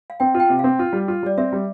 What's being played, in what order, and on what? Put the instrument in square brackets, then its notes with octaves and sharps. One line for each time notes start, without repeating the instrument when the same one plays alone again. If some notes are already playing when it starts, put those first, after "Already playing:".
[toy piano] F5
[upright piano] C4 [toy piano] G5
[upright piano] F4
[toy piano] G5
[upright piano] C3
[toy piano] F5
[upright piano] C4
F4
G3
F4
[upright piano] G3 [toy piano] D5
[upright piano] C4 [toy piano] E5
[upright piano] G3